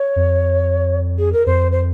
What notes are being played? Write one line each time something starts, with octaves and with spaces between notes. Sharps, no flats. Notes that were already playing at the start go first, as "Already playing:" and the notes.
Already playing: C#5
F2
G#4
A#4
F2 C5
C5